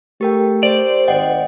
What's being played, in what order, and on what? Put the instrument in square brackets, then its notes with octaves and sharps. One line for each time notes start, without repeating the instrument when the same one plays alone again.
[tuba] A3 [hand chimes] G4 A#4 G5
[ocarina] C5 [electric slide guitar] D5
[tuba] G#1 [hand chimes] D#5 F#5 G5